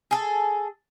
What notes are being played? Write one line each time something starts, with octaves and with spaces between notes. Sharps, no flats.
G#4 A4